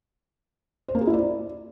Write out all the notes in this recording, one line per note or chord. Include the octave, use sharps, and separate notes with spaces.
C5
A#3
G#4
E4
D5